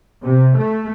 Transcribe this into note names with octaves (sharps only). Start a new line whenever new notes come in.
C3
A3